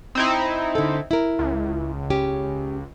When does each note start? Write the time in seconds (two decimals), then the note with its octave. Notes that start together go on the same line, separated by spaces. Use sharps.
0.15 C4 D#4 E4
0.75 D3 A4
1.11 E4 A#4
1.39 C#2
2.10 C#4 G4